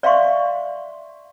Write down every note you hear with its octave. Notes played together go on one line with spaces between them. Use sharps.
D5 E5 F5 C6 C#6